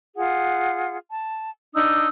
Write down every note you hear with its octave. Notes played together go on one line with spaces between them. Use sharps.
F4 G#4 F#5
A5
D4 D#4 D#6 E6